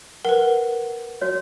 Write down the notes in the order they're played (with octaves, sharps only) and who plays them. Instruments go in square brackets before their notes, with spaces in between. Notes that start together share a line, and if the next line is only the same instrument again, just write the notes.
[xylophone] A#4 B4 [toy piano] F#5
[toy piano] F#4 C#5